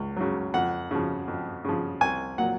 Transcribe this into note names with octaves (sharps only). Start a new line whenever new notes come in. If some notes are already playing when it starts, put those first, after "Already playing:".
Already playing: C#2
C#3 F#3
F2 F#5
C#3 F3
F2
C#3 F3
C2 G#5
A#2 F#3 F#5